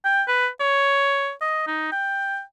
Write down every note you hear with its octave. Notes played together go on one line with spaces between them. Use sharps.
G5
B4
C#5
D#5
D#4
G5